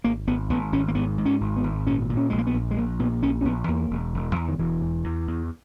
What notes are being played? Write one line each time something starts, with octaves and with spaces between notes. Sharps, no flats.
G#1 A#3
G#1 B3
G#1 B3
G#1 C#4
A#3
G#2 B3
G#2
C#4
G#1
B3
G#1
A#2 C#4
A#2
C#4
A#1 G#3
A#3
B3
A#1
G#3
A#1 A#3
A#2 B3
A#1 C#4
C#4
A#1 B3
E2 A#3
E1
E1
E2
D#3
E1 E3
E1
E2
E2